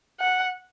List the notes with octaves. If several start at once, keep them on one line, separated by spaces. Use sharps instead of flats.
F#5